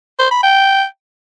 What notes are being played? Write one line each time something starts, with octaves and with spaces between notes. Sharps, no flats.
C5
B5
G5